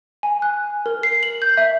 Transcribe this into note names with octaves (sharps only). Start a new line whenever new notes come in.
G#5
F#6
A#4
C7
F#7
G6
E5